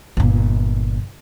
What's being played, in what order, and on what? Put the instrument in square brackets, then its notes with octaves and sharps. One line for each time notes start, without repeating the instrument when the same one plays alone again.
[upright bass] G1 A#2